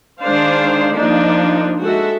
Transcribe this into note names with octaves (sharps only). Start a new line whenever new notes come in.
D#3 G#3 D4 C5 D5 F5
F3 A#3 D4 D#4
G#3 F#4 A4 E5